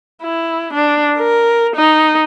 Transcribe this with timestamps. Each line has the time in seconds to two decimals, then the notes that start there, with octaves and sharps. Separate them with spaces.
0.23 E4
0.73 D4
1.18 A#4
1.76 D#4